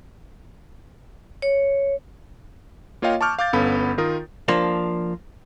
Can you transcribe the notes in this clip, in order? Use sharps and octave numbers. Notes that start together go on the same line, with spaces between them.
C#5
A#3 F4 C#5 D#5 F5 G5
A5 C#6 D6 F6 G6
F5 D6 G6 A6
G1 B3 C#4 A4 F5 B5
D#3 F4 A#4 D#6
F3 A#3 D4